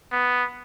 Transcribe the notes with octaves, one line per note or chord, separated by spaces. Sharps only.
B3